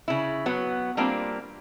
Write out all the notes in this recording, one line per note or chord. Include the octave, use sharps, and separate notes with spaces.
C#3 E4
F#3 B3
G3 A#3 C4 D4 F4